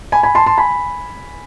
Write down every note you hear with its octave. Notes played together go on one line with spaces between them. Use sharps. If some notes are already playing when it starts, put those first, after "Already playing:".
G#5 B5
G#5 B5
A5 C6
A5 C6
G#5 B5